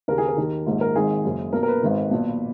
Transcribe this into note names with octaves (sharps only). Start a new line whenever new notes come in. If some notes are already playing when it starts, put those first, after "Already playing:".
D#2 C#3 A#4
G#4
A#4
D#2 D#3
A#1 G#2 D#3
A#4
G#1 G#2 D#3 G#4
F#1 F#2 C#3
B1 A#2 A#4
A#4
B4
G#1 G#2 D#3
B1 A#2